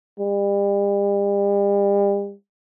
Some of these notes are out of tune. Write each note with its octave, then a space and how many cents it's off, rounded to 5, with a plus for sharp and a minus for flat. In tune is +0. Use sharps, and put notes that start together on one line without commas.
G3 +40